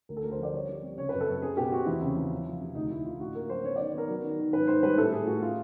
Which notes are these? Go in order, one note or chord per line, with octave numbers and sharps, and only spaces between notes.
D2 A#4
A4
D2 A#4
C5
F3 D5
G3 C#5
G3
C4
C#3 C#5
F#2 B4
A4
F#2
C4 G#4
B2 G4
C4 F#4
E2 E4
C#3
E2
F3
F3
C3
D2 D#4
D2 E4
D3 F4
A2 F#4
A#3 A#4
F#3 C5
B3 C#5
D#3 D5
B3 A#4
F#3
D#3
D#3
G#2 B4
G#2 C5
G3 B4
A2 A4
A2 G#4
A2 F#4
A3 F4